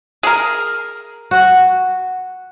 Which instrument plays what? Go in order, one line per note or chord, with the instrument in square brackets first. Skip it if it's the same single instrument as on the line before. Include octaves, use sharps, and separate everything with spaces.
[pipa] G#4 A#4
[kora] F#4